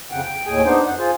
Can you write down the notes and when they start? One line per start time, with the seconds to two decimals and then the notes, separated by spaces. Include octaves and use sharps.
0.11 F2 C#3 F#5 G5
0.23 G5
0.46 D#2 A2 G#4 G5 G#5
0.65 B3 D4 D#4 C5
0.85 F#2 F#5
0.98 F4 G#4 C5